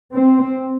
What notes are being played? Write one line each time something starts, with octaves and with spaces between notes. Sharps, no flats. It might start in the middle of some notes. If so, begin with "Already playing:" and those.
C4